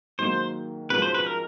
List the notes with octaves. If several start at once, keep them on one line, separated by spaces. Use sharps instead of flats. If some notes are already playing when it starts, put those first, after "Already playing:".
G#2 D#3 F#3 A#3 C5
G#2 F3 G#3 C#4 F#4 B4
C5
B4
A#4